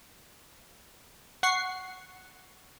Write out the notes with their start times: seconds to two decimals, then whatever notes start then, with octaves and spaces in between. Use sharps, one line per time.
1.43 F#5 C#6 C7